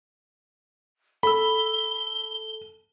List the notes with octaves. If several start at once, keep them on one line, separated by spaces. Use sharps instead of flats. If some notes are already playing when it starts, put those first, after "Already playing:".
A4 B5 E6 G7